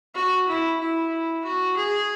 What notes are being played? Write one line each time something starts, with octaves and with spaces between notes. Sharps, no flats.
F#4
E4
E4
F#4
G#4